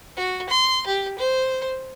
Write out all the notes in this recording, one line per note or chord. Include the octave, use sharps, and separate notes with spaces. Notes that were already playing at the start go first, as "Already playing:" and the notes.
F#4
C6
G4
C5